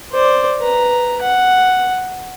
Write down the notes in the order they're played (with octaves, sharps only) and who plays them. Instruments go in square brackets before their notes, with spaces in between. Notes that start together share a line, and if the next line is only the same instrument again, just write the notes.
[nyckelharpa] C5 D5
B4 A#5
F#5